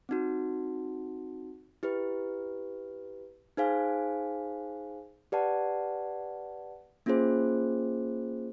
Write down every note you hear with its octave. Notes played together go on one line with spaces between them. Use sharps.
C4 D#4 F#4
E4 G4 B4
D#4 G#4 C5 F5 G#5
G4 B4 D5 F#5 A5
A#3 C#4 F4 G#4 C5